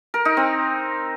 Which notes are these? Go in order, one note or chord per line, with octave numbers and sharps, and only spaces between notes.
A#4
D#4
C4